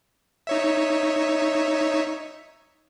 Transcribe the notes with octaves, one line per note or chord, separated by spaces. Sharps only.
D#4 C#5 E5